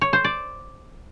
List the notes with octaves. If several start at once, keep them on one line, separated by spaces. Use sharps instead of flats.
C#5
C5
D5